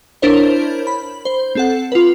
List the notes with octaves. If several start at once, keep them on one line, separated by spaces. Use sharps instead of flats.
D4 E4 A#4 C5 C#5
B5
C5
C4 A4 F#5
F4 B4